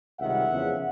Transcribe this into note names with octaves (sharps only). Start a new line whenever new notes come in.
C#2 C3 D#3 G3 E5 F#5
E2 C#3 F3